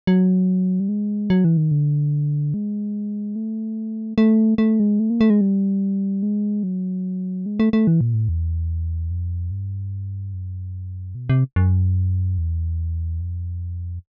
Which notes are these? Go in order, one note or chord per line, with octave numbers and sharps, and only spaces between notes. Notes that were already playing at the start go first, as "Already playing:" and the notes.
F#3
G3
G#3
F#3
E3
D#3
D3
G#3
A3
A3
A3
G#3
A3
A#3
A3
G#3
G3
G#3
F#3
G#3
A3
A3
E3
A#2
A2
E2
F2
G2
F#2
B2
C3
F#2
E2
F2